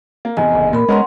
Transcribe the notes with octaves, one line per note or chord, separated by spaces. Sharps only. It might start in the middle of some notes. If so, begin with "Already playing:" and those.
A#3
F1 E2 D#5 G#5
F#1
A#2 A#4 B5
G#3 B3 C#4 A#4 F#5 C6